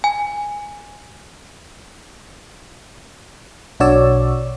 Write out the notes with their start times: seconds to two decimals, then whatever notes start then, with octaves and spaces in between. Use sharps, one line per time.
0.04 G#5
3.80 B1 D4 F#4 C#5 D5 E6